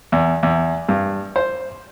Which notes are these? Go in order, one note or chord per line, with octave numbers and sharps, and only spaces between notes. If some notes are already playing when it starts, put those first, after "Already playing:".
E2
E2
G2
C5